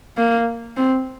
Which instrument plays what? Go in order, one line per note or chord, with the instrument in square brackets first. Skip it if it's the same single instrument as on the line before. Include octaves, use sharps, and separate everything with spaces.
[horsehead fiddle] A#3
C4